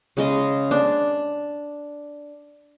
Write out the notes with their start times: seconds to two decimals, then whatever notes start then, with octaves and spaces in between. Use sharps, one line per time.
0.17 C#3 G#3 D#5
0.71 D4